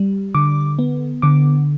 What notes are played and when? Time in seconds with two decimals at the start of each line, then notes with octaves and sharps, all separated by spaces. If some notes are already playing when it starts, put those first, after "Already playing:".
Already playing: G3
0.35 D3 D6
0.79 B3
1.22 D3 D6